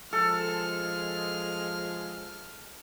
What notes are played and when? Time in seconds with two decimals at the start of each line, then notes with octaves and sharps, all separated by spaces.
0.13 F3 G#3 G#4 A4 F6